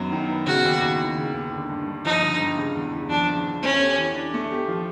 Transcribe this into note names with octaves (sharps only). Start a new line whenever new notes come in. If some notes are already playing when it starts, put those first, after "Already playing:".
Already playing: F#2 D#3 F#3 B3
D#3
B3
C#3 F#4
D#2
D#2
E3
C#3
D#2
D3
G2
G2
F3 D#4
D3
G2
C#3
E2
E2
F3 D4
C#3
E2
A3 C#4
G4
E3
D4
A3
G4
F3